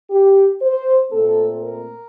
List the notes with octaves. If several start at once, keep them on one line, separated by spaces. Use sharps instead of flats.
G4
C5
A#2 A3 C4 A4
A#4